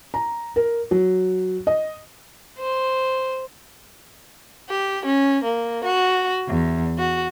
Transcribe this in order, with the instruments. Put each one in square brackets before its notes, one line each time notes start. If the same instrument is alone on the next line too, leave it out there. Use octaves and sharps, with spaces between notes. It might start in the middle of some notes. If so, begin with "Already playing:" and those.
[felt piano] A#5
A#4
F#3
D#5
[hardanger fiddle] C5
[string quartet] G4
C#4
A#3
F#4
E2
F#4